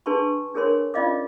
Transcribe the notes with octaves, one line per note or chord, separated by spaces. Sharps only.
D4 G#4 B4 A5 C6 C#6
D4 G#4 A#4 C#5 C6
C#4 F4 D5 D#5 F5 D6